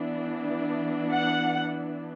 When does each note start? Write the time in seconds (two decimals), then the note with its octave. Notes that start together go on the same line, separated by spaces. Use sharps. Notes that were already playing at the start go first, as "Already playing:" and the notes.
Already playing: E3 B3 D4
1.12 F#5